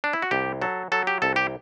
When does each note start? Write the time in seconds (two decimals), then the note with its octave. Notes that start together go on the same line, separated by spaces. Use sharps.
0.04 D4
0.13 E4
0.22 F#4
0.31 C2 G4
0.62 F#3 A4
0.92 F#3 A4
1.07 G4
1.22 C2 A4
1.36 G4